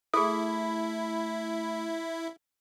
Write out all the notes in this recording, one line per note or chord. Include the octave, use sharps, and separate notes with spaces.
A3 E4 G#4 A4 B5